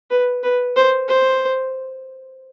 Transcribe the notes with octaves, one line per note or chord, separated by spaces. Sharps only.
B4
B4
C5
C5